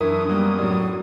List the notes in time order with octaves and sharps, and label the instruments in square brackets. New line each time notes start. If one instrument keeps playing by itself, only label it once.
[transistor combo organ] F#2 D#6 [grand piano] E3 E4 [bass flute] D4 [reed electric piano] A#4
[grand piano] F#3 A#3 B3 [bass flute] G3
[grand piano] A2 D4 [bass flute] F#3